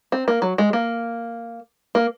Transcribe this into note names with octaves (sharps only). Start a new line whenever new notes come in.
C4
A#3
F#3
G#3
A#3
A#3